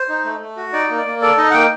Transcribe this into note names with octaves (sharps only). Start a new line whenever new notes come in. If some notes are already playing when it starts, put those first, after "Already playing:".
Already playing: C5
D#4
A3
A3
F#4
D#4 D5
A#3
D5
A#3
A4 D5
D#4 D#5
F#5
A#3 G5